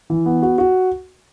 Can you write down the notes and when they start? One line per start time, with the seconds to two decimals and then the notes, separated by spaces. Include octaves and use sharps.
0.10 E3
0.26 B3
0.42 F#4
0.58 F#4